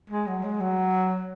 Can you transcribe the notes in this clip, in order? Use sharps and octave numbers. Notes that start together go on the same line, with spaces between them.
G#3
F#3
G#3
F#3